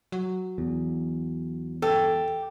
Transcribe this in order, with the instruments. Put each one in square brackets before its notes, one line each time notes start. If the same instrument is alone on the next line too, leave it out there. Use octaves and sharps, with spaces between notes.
[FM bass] F#3
[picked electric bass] E2
[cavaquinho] G4 [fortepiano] A4